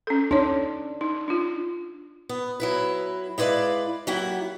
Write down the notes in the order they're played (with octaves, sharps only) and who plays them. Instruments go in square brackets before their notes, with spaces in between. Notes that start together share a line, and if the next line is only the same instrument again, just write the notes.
[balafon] C#4 A4
[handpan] D4 [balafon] D#4 C#5
[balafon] D#4
D4 F4
[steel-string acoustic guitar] B3
F#3 E4 B4
G#3 E4 B4 D5 F5
F#3 A#3 E4 G4 F#5